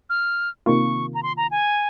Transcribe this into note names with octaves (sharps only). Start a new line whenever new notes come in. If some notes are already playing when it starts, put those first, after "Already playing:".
F6
C3 D#3 A#3 F4 C#6
A#5
C6
A#5
G#5